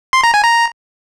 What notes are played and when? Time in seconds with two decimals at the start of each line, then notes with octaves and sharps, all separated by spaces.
0.13 C6
0.24 A#5
0.34 G#5
0.43 A#5